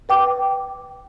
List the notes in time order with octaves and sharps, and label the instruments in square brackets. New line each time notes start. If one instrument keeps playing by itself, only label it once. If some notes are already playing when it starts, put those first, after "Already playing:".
[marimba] B4 G5 D6